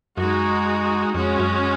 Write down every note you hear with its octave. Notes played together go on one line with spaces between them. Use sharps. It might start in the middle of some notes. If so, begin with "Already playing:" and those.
F#2 G#3 D#4 F#4
F2 G#3 C#4 F#4
F#2